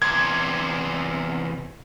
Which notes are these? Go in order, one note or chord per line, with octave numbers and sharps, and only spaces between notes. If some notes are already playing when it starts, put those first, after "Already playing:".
E2 C3 G#6